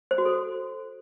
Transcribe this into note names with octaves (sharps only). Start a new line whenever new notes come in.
C5
F#4
A4